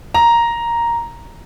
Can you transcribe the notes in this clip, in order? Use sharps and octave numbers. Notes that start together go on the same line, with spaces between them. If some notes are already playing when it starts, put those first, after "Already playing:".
A#5